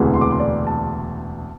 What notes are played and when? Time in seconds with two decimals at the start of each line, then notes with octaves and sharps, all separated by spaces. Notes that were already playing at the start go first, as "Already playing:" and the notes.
Already playing: E1 D2 C3 E3
0.14 C6
0.21 D6
0.31 C6
0.39 D5
0.67 A5